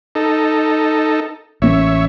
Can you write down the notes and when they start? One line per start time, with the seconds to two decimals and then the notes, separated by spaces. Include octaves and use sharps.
0.15 D#4 A4
1.62 A1 A#3 C#4 C#5 E5